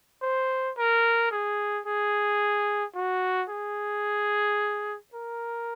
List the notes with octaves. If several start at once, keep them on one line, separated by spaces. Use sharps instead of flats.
C5
A#4
G#4
G#4
F#4
G#4
A#4